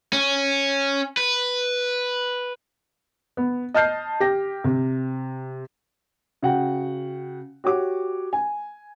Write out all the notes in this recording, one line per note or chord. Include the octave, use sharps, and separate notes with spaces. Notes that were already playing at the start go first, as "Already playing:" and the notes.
C#4
B4
B3
D#5 A5 F6 G6 C7
G4 A#6
C3
C#3 F#4 F#5 G5
F#4 G4 C#5 F#5 D6
G#5